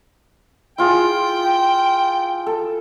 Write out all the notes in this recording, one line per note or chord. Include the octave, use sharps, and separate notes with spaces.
E4 F4 G#4 G5
A4